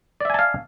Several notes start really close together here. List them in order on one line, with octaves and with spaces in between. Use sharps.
D5 E5 G#5 A5 F5